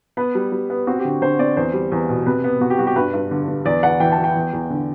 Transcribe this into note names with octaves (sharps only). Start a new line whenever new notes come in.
B3 B4
G3
G3
B3
C4 F#4
G4
D3
D3 C5
C4 D5
E2 C5
G3
E2
B2
C3 B4
B3
C3 F#4
G4
G3 F#4
G4
G2 B4
G2
D3
D3
E2 D5
E2 F#5
E3 G5
A5
E3
G5
E2
E2
D3